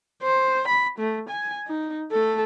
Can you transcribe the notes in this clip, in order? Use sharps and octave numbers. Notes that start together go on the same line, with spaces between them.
C5
B5
A3
G#5
D#4
A3 A4